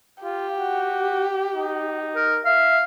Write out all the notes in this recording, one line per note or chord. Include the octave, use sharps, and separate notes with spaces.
F4 G4
F#4
D#4
A#4
E5 F5